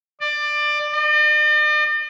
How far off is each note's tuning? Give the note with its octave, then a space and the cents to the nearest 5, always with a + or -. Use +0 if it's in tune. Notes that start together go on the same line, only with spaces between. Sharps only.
D5 +20
D5 +45